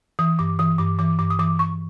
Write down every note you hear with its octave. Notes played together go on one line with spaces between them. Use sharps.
E3 D#6
G2 D6
E3 D#6
G2 D6
E3 D6
G2 D6
D#6
E3 D6
G2 C#6